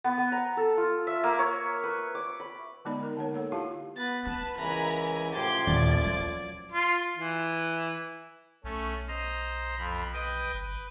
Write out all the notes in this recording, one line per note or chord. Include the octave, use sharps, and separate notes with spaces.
B3
B3
A#5
A4
F4
E5
A#3
C#5
B4
D6
B5
D3 G#3 B3 D#4 D5 B5
D#4 A#4
D3 A#3 C#5
A4 C#5 F#5
E4 F4 G4 F5 A5
B3 B4 A6
D#4 B4 A5
C#2 E3 A#4 G#5 A#5 B5
F#2 A2 F3 G4 C6 G#6 A6
D#2 A#2 D5
F#3
F4
E3
B1 A3 C#4
C5 D#5 A#5
F2 B5
B4 D#5 G5
G1 B4